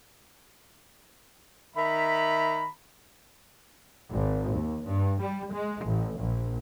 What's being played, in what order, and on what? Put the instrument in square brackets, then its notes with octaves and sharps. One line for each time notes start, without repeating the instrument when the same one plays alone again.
[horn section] D#3 A#5 B5 [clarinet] E5
[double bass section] G#1
D#2
G2
G3
G#3
A1
A#1